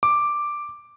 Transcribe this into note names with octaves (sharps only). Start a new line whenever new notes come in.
D6